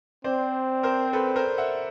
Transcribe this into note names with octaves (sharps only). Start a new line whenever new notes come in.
C4 C5 D5
A#4 C5
A4 B4
A#4 C5
E5 F#5